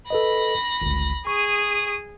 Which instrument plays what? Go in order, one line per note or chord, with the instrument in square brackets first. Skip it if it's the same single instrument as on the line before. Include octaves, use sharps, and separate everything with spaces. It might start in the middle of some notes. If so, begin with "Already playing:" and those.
[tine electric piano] A4 B4 D#5 [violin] B5 A#6
[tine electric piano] G1 C#2
[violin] G#4 D#6 [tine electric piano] C#6